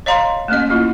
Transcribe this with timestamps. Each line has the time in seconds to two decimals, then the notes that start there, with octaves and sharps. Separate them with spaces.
0.06 C#5 D#5 F5 A#5 C6
0.48 A3 A#3 C#4 D#5
0.70 A#3 E4 F4